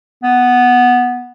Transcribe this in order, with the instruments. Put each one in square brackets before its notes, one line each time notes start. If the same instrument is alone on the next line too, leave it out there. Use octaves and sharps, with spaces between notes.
[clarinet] B3